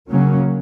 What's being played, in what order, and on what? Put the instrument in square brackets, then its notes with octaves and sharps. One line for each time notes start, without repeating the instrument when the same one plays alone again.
[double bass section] C#3 F#3 A#3 C#4